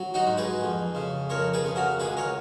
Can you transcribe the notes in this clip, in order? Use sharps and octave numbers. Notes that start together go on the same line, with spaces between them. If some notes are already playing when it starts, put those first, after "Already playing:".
Already playing: F#3
D#4 F#4
G#2
G#4 B4
F2
C#3
F2 A#4 C#5
G#4 B4
C#3
F#4 A#4
C#2 G#4 B4
A#4 C#5